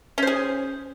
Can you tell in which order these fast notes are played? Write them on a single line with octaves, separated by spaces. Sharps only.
C#4 C5 G#4